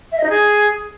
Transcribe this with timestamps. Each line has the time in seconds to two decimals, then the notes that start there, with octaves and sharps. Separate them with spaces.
0.12 E5
0.18 D#5
0.24 D#4
0.29 G#4